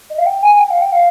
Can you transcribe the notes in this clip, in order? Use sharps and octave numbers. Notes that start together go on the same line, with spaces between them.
D#5
F5
G5
G#5
G#5
G5
F5
G5
F5